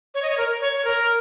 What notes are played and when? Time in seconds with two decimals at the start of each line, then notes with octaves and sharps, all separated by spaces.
0.14 C#5
0.23 D#5
0.30 C#5
0.38 A#4
0.61 C#5
0.77 C#5
0.85 A#4